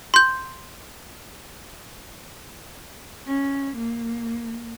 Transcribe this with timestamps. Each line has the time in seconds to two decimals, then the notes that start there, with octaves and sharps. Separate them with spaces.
0.14 C6 G6
3.26 C#4
3.76 A#3